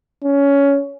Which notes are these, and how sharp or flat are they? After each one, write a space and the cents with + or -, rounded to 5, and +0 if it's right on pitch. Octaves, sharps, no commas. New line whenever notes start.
C#4 +15